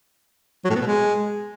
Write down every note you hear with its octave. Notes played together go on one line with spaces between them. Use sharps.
F#3
A2
B3
B2
G#3